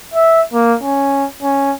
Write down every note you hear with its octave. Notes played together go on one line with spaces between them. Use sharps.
E5
A#3
C#4
C#4